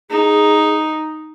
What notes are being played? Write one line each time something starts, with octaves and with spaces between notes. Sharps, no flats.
D#4 G#4